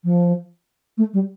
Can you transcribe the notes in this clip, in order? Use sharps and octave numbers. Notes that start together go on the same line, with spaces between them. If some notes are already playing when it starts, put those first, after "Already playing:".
F3
A3
G3